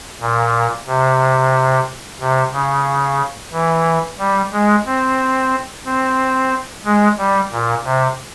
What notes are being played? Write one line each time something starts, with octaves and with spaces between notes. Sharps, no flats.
A#2
C3
C3
C#3
E3
G3
G#3
C4
C4
G#3
G3
A#2
C3